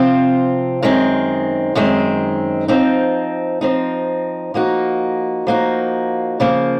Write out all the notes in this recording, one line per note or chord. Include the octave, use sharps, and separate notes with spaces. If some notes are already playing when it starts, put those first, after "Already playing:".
Already playing: C3 F3 C4 F4
F#2 D#3 G#3 C4
F#2 D#3 G#3 C4
F3 C4 D#4
F3 C4 D#4
F3 A#3 D#4 F#4
F3 A#3 D#4 F#4
C#3 F3 A#3